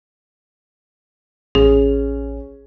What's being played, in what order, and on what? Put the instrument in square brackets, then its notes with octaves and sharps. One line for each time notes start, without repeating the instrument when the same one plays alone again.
[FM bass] A1 [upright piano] C#4 [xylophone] G#4